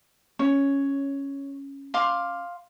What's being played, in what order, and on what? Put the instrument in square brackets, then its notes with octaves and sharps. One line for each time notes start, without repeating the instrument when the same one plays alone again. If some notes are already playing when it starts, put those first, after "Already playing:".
[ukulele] C#4 [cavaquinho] C#5
[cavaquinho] F5 C6 D6